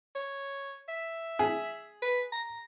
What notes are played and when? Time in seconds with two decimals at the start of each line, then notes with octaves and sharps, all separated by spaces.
0.15 C#5
0.88 E5
1.39 G#4
2.02 B4
2.32 A#5